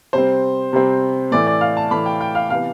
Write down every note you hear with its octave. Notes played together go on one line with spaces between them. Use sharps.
C3 G3 C4 C5
C3 G3 C4
A2 E3 A3 D5
D5
F5
A5
A2 E3 A3 B5
G5
G5
F5
C3 E3 B3 F5